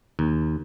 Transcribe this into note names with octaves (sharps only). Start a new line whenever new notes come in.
D#2